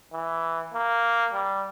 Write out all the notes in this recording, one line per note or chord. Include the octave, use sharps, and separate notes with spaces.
E3
A#3
G3